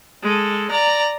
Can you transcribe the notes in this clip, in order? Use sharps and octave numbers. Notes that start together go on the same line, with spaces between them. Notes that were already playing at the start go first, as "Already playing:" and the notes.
G#3 A4
D5 A#5